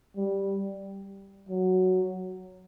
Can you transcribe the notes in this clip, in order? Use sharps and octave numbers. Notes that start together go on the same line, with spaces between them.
G3
F#3